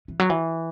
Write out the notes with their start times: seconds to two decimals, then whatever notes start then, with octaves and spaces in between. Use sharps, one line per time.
0.08 E3
0.20 F#3
0.30 E3